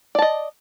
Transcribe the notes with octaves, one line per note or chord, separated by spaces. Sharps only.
D5 D#5 A5